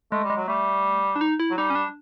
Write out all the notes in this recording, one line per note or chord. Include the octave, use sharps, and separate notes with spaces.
G#3 A3
G3
G#3
F#3
G3 A3
D4
D#4
E4
F#3
G3 D#4
C#4
D4